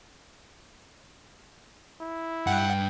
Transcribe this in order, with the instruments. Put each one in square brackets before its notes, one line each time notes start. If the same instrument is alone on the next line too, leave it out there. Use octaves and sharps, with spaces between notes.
[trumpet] E4
[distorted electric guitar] G2 [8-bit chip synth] F#5 [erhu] G5